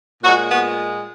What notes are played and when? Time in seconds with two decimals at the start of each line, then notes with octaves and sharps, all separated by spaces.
0.23 A#2 F#4
0.27 G#3
0.50 B3